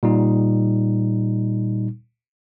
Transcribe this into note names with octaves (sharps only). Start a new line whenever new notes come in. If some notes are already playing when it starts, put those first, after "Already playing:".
A#2 G3 D#4